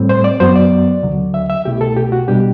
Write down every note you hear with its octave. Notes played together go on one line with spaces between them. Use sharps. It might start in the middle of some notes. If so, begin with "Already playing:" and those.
Already playing: A2 G3 C4
C5
D5
F#2 F#3 B3 C5
D5
D2 D3 F#3
E5
E5
C2 B2 A3 E4 G4
A4
G4
F#4
B2 G3 D4 G4